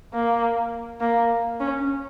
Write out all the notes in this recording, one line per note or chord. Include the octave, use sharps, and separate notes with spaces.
A#3
A#3
C#4